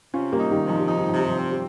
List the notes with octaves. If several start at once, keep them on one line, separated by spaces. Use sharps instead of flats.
C3 C#4 F4
G3 A#3
D#4
D#3 G3
C3
F3
G3
F3 D#4
G3
C3 F3
G3
F3
C4
G3